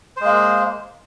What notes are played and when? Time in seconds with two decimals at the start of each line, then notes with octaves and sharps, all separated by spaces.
0.17 C5
0.21 G#3
0.25 A#3